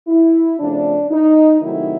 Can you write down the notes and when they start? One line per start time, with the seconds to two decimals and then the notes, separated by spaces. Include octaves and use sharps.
0.08 E4
0.59 F2 C#3 F3 A3 D4
1.11 D#4
1.61 C3 D#3 F#3 A3 C4 E4